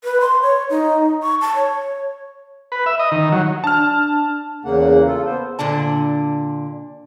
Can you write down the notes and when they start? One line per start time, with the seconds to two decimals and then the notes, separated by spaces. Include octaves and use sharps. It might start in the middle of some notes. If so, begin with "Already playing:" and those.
0.04 B4
0.21 C6
0.42 C#5
0.70 D#4
1.23 C#6
1.41 A5
1.55 C#5
2.72 B4
2.86 E5
2.99 D#5
3.12 D#3
3.32 F#3
3.64 D4 A5 F6
4.65 E2 C#3 A#3 F#5
5.07 F4 A4
5.26 B3 C5
5.59 A#2 D3 D4 A5